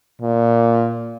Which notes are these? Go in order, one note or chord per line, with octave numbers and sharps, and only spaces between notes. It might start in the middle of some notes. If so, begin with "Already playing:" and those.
A#2